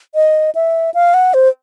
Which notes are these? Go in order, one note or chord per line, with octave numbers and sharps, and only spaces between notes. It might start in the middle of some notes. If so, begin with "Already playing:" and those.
D#5
E5
F5
F#5
C5